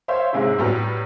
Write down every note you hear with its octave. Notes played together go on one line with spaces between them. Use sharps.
C5 C#5 E5 F5 C6
G#2 C3 G#3 C#4 E4
A2 F#3 G3 B3 A#5 F6